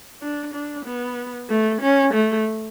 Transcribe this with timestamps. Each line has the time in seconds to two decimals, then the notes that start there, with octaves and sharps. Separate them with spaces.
0.21 D4
0.54 D4
0.85 B3
1.49 A3
1.81 C#4
2.13 A3